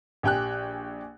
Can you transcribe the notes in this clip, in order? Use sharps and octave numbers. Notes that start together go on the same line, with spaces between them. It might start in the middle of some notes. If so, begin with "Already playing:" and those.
A#1 G4 G5 G#5 F#6